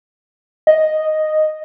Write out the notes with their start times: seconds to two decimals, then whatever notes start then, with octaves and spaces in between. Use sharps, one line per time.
0.67 D#5